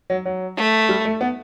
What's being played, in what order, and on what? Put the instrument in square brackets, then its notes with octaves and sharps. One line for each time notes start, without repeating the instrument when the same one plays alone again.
[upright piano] F#3
F#3
[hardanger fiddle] A3
[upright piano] G3
A3
B3